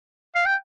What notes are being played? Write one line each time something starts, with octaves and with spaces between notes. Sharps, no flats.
F5
G5